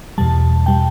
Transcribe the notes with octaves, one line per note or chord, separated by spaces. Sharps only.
E2 B2 G3 A5
B2 G3 G5